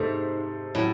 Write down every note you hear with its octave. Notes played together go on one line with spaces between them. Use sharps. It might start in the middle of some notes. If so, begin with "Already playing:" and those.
Already playing: G#2 C3 A3 D#4 A4 C5
A2 F#3 C#4 E4